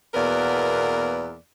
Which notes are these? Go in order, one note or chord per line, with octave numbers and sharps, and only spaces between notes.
E2 B2 A#3 A#4 B4 D5